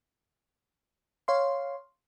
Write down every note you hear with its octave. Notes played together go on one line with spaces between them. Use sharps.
C#5 F5 C6